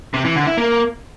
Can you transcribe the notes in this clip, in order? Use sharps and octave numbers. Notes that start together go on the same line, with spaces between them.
C3
E3
D3
E4
A#3